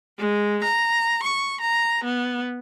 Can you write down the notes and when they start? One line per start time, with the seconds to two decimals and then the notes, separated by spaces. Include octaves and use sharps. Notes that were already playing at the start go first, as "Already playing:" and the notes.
0.19 G#3
0.64 A#5
1.23 C#6
1.61 A#5
2.04 B3